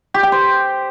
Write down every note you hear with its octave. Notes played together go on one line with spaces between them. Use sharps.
G4
G5
C5